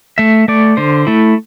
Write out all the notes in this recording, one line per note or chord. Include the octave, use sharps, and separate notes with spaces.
A3 E5
A3 D5
D3 C5
A3 E4